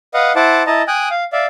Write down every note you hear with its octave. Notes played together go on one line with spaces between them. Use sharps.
B4 D#5 F5 F#5
E4 C5 F#5 A5 D6
E4 D#5 A5 A#5
G5 G#5 D#6 F#6
F5
D5 E5 F5